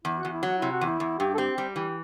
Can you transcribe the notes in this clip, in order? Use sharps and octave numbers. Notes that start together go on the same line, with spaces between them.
E2 E4
F#4
E2
E4
F#3 F#4
C3 E4
F#4
E2 E4
E2
G2 G4
A4
C4 G4
G3 G4
E3 G4